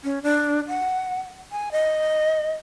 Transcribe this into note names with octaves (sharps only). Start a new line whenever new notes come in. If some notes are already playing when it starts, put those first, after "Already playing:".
C#4
D4
F#5
G#5
D#5